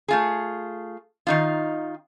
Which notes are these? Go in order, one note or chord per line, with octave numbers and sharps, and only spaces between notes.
A3 F4 G#4
D#3 D#4 F4